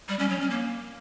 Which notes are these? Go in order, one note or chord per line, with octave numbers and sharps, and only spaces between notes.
G3
C#4
F#3
C#4
A#3